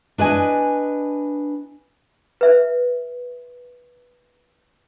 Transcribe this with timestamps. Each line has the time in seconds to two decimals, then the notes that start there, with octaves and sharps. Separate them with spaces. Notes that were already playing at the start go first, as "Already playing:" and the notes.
0.18 D4 B4 D#5 G#5
2.41 B4 E5